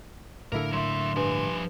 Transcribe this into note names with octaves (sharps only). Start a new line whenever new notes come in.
A2 D3 A#3 E4 A4 A#4
F#3 E5 C6
G2 F3 G#5